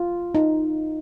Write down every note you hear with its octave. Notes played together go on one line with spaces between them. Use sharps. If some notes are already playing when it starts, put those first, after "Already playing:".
Already playing: F4
D#4